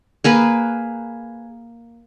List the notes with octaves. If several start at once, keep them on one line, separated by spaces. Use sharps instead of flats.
A#3 G#4 B4